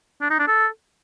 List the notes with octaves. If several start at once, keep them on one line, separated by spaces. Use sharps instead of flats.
D4
D#4
D4
A4